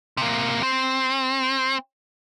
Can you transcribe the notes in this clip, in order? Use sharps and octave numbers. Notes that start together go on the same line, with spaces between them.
C3 A#3
C4